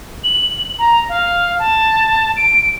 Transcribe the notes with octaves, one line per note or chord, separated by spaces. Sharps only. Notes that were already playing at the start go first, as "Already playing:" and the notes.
F#7
A#5
F5
A5
D7